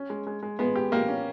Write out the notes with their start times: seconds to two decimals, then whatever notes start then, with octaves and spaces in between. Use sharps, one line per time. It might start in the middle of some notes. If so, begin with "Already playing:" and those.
Already playing: C#4
0.10 G#3
0.27 G#3
0.43 G#3
0.59 G#3 B3
0.76 G4
0.92 A#3 G4
1.08 C#4